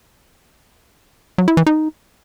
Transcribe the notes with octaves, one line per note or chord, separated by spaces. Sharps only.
F#3
E4
E3
D#4